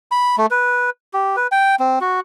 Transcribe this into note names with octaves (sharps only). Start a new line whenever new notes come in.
B5
A3
B4
G4
B4
G5
C4
F#4